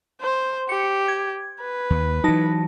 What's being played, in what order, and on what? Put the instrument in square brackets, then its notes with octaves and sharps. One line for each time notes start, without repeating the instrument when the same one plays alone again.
[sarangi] C5
[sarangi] G4 [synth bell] C#7
[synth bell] G#6
[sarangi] B4
[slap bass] D#2
[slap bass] E3 F#3 [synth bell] D#4 A5 A#6